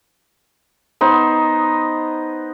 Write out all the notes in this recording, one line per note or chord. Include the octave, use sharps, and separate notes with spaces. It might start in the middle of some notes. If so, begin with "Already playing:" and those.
B3 D#4 C5